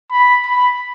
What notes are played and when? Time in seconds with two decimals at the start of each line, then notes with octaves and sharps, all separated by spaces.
0.11 B5
0.46 B5